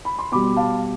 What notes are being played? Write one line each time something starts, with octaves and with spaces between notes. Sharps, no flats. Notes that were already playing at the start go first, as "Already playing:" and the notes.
B5
C6
B2 G3 B5 D6
F5 A5